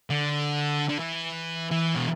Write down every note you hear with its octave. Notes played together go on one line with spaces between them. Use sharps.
D3
D3
E3
E3
B2